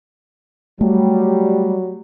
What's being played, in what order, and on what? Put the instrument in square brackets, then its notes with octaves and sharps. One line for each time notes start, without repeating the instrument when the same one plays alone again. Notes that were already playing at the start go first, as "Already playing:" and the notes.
[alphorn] F#3 [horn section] G3 [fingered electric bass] A3